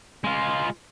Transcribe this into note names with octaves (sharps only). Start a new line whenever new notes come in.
G#3 F4